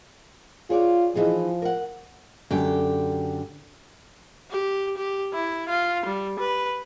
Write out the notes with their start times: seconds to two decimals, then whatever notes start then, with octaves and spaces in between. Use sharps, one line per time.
0.70 F4 G#4 C#5 D5
1.15 E3 F3 D#4 G#4
1.62 A#4 F#5
2.51 F#2 D3 G4 G5
4.51 G4
4.97 G4
5.33 E4
5.69 F4
6.06 G3
6.39 B4